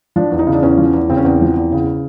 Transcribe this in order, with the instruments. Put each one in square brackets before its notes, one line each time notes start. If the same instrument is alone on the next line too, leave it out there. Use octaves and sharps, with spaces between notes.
[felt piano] F3 D4
E2
D#4
C#3
D4
E2 C#4
F3
E2
C#3 C4
C#4
E2 C4
F3
E2
C#3